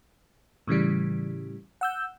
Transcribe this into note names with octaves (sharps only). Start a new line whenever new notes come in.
A2 C#3 E3 G3
F#5 E6 G6